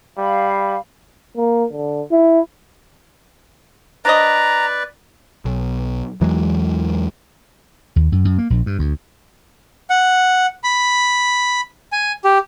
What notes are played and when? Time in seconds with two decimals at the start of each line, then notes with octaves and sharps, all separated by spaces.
0.18 G3 F5 B5
1.37 A#3
1.73 D3
2.11 E4
4.05 D4 B4 C5 D5 D#5 A#5
5.45 B1
6.21 E2 E3 F#3 G#3
7.96 D#2
8.12 F#2
8.25 F#2
8.38 A#3
8.50 A#1
8.66 G2
8.79 D2
9.90 F#5
10.64 B5
11.92 G#5
12.24 G4